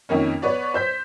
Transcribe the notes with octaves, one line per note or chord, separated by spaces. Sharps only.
F2 D#3 A#3 C#4
B3 B4 C#5 D5
C5 G6 B6